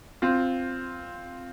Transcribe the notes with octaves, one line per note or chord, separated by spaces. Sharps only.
C4 F4